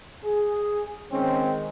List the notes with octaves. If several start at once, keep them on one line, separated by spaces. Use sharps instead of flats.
G#4
D#3 G#3 C4 C#4